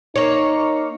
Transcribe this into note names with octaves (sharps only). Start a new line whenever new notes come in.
A#3 D#4 C#5